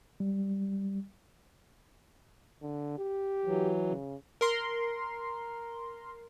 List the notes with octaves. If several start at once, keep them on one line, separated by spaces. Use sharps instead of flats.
G3
D3
G4
E3 F#3
C#3
A#4 C6